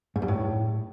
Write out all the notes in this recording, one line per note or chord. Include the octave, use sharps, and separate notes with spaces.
G#2
G2
A2